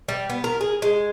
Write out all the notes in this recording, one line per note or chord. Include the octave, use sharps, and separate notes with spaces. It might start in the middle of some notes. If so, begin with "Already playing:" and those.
G3
B3
A#4
G#4
G#3